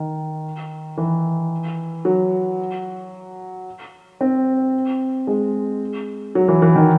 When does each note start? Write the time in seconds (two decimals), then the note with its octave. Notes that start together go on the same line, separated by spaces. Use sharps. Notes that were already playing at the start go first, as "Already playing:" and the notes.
Already playing: D#3
0.97 E3
2.05 F#3
4.21 C4
5.27 G#3
6.35 F#3
6.48 E3
6.62 E3
6.76 D#3